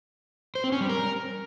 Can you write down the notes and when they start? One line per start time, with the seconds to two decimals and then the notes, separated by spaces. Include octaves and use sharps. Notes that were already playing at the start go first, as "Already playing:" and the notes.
0.55 C5
0.64 C4
0.72 C#4
0.81 G3
0.89 A#4